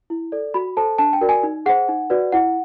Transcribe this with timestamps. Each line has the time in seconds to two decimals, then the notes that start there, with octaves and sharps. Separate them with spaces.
0.10 E4
0.32 A4 D5
0.54 F#4 B5
0.77 A4 C5 A5
0.98 D4 A5
1.13 G5
1.21 F#4 A#4 D5
1.29 G#5
1.43 D#4
1.66 G#4 C5 F#5
1.89 D#4
2.10 F#4 B4 D5
2.32 E4 F#5